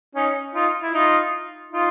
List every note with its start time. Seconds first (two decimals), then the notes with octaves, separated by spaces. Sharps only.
0.15 C#4 D#4
0.55 D#4 F4
0.82 E4
0.94 D#4 F4
1.72 D#4 F4